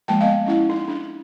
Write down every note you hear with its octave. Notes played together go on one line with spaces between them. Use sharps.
F3 G#3 A#3 F#5 G5 A5
B3 D#5 F5
C#4 E4 F#5
D#4
D4